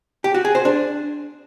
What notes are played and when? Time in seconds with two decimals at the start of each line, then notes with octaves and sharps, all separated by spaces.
0.24 G4
0.34 F#4
0.45 G#4
0.55 C5
0.65 D4